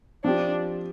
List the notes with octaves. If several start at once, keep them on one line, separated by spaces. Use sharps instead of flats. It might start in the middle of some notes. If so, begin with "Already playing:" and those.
F3 C4 D4 G4